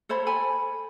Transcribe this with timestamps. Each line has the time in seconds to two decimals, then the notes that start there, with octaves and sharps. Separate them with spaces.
0.09 A4 C5 C#5 B5
0.26 A4 G#5 B5